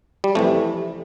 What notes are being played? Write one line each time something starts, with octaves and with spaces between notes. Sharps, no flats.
G3
F2 C3 E3 A3